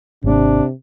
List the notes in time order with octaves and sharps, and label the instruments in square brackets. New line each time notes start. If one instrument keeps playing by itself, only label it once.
[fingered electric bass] G#1 A#3 [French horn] C3 [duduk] D4